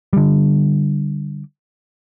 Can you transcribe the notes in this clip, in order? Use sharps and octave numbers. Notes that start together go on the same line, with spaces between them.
D3 G3